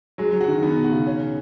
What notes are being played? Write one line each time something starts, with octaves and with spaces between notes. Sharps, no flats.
F#3 G#3
F#3
F#4
D#3
D#3 B3
B2
F#4
C#3
C#4